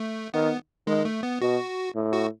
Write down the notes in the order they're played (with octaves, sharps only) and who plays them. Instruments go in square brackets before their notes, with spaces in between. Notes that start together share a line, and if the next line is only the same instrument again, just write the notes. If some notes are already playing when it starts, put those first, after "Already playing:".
Already playing: [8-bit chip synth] A3
[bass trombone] D#3 [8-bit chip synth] B3
[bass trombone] D#3 [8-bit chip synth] G#3
[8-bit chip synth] A3
B3
[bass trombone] B2 [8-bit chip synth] F#4
[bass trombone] A2
[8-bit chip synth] F#4